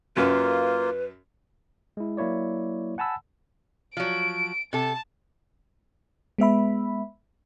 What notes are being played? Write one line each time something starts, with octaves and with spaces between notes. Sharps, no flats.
F#2 A#3 F4 B4
G#3 E4
F#3 A#3 E4 C#5 D5
F#5 G#5 A5 B5 E6
F3 F#3 D7
C3 A4 A5
G#3 B3 E5 B5